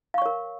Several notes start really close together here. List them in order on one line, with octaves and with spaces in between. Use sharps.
F5 C#6 C#5 A#4